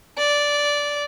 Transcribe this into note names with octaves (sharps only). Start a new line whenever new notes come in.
D5